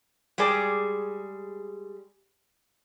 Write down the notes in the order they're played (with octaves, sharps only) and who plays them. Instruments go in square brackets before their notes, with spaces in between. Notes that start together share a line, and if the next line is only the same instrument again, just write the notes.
[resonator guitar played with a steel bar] G3 G#3 G#4 D5